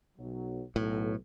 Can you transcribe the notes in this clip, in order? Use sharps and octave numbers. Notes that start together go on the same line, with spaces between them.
B1 F#3
B1 A2